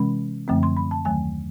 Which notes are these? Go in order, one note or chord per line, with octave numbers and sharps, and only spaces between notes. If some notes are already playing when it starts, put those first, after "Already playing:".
Already playing: C3 E3 G#3 C#4 B5
F#2 D3 F3 A3 C4
C6
B5
A5
D#2 D#3 F#3 A3 G#5